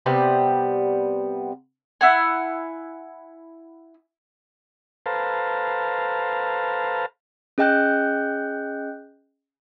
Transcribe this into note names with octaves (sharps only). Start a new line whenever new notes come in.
C3 G3 B3
E4 F#5 G#5
A4 B4 C5 F5 A5 A#5
C#4 G#4 D#5 G5 F#6 G6